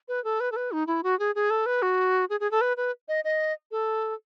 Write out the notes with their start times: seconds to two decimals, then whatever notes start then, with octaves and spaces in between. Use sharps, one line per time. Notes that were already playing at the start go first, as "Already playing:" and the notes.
0.08 B4
0.24 A4
0.40 B4
0.52 A4
0.56 B4
0.72 D#4
0.87 E4
1.03 F#4
1.19 G#4
1.35 G#4
1.50 A4
1.66 B4
1.82 F#4
2.30 G#4
2.40 G#4
2.51 A4
2.61 B4
2.77 B4
3.08 D#5
3.25 D#5
3.71 A4